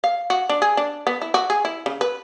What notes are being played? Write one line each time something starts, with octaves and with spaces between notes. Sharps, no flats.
F5
F#4
D4
G#4
D4
B3
E4
F#4
G#4
E4
C#3
B4